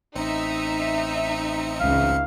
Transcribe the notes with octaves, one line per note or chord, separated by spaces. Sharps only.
A1 C4 D#4 E5 C#7
C#2 C#3 F5